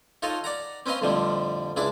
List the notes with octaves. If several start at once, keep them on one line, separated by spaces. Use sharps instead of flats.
D#4 F4 A4 C#5 D#5 F5
D5 F#5 A#5
C4 C#4 B4 D#5 F5 C6
F2 A2 D3 F3 G3
C#2 G#3 D4 E4 D6